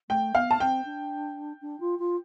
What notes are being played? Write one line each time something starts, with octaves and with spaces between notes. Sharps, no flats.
A3 G5
B3 F5
A5
C4 G5
D4
D4
F4
F4